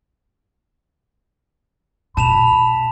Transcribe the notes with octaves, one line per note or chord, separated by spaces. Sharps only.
B2 A5 B5 E7 F7